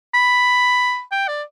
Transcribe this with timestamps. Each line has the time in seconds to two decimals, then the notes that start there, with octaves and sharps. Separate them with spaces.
0.14 B5
1.12 G5
1.28 D5